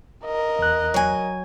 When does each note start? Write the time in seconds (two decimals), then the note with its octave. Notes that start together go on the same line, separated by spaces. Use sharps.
0.25 A#4 D#5
0.59 E2 F#6
0.94 F#3 G#5